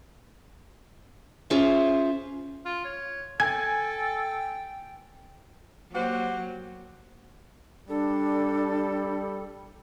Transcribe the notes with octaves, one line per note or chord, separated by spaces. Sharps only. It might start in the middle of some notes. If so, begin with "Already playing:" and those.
C#4 F4 G#4 C5 E5
F4
C#5
A4 G5 G#5 G#6
F#3 A#3 F#4 G4 C5
G3 D4 A4